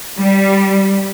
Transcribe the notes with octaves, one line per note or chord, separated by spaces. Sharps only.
G3